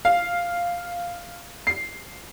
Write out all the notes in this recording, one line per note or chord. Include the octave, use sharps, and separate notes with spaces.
F5
C7